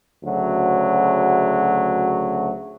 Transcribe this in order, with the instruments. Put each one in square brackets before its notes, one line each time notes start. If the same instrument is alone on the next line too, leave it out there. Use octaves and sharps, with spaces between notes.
[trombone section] D2 C#3 F#3